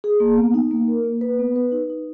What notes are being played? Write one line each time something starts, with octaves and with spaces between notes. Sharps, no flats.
G#4
A#3
B3
D#4
A#3
A#4
A#3
B4
B3
B4
D#4
D#4